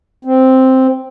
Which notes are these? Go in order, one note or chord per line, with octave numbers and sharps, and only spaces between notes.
C4